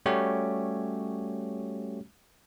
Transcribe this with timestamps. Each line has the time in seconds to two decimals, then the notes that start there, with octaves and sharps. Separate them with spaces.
0.06 G3 A3 C#4 F#4 G4 C#5